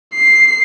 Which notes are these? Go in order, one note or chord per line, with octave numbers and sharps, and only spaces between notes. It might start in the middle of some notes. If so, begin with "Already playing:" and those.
C7